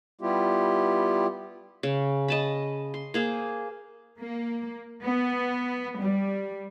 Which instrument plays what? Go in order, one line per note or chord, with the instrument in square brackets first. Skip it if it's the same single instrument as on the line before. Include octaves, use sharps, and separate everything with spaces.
[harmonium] G3 B3 E4 F4 G4
[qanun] C#3
D#5 A5 B5
C6
A#3 G#4 C5
[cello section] A#3
B3
G3